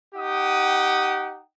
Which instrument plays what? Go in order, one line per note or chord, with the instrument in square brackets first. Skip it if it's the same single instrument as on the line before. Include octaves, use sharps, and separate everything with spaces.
[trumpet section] D#4 G4 F#5 G5 D#6